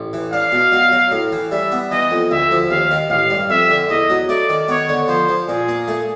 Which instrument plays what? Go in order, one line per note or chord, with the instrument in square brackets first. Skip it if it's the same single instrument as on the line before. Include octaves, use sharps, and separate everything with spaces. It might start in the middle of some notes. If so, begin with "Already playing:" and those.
Already playing: [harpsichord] A1
E3
[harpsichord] D4 [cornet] F5
[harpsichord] B2
F#3
F#3
A2
E3
[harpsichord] G3 [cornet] E5
[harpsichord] B3
[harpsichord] E3 [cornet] D#5
[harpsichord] F2
[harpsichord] D2 [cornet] E5
[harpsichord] F3
[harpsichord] D#2 [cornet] F5
[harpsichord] D#3
[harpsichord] A1 [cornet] F5
[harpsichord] G2
[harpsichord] F2 [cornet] E5
[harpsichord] D3
[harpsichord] E2 [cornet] D#5
[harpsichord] F#3
[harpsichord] A3 [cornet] D5
[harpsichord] D#3
[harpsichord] B3 [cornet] C#5
[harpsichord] D3
[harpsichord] F3 [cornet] C5
[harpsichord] F3
[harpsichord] A#2 [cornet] G#4
[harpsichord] A#3
A3